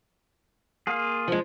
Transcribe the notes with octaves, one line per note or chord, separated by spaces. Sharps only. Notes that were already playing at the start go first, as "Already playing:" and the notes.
A#3 F4 G#4
F3 G#3